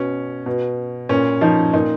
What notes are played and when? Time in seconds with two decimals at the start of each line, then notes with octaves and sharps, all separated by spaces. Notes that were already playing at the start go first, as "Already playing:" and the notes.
Already playing: B2 C#4
0.46 B2
1.09 A#2 C#4
1.41 F3 D#4
1.73 A#2 D#4